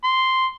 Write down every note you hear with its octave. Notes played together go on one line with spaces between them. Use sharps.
C6